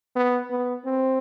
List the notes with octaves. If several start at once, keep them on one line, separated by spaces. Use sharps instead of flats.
B3
B3
C4